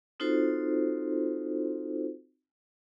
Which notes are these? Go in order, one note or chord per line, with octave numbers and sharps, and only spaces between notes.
C4 D#4 F4 F#4 A4 C5